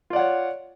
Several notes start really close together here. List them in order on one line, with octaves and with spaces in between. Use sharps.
F4 D5 F#5 C#5